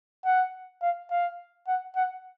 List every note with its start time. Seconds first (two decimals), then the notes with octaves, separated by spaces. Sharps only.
0.25 F#5
0.82 F5
1.11 F5
1.67 F#5
1.96 F#5